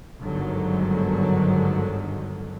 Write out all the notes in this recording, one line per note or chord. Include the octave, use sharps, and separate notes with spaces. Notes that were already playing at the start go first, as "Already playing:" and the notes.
G1 G#2 D3 D#3 F#3